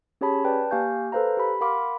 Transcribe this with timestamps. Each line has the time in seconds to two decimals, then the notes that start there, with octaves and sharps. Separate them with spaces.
0.21 C#4 G4 G#4 C#5 A5 B5
0.45 B4 D5 G5 A5
0.71 A#3 G4 F5 G#5 C#6 G6
1.12 A4 B4 C5 F5 A#5
1.37 G4 B5
1.61 A#4 F5 F#5 B5 C6 D6